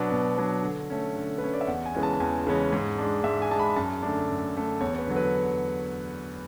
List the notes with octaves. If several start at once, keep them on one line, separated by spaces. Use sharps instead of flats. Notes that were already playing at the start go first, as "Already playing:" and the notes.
Already playing: B2 F#3 B3 D4
B2
F#3 B3 D4
D3
A3 C#4
D3
B4
A3 C#4 C#5
D5
E5
E2 F#5
G#5
C#3 E3 G#3 C#4
A5
A5
E2 G#5
C#3 E3 G#3 C#4
G#2
G#3 D4
G#2 E5
G#5
G#3 D4 A5
B5
F#2 A5
D3 A3 D4
F#2
D3 A3 D4
E2 C#5
C#5
B4
D3 F#3
B4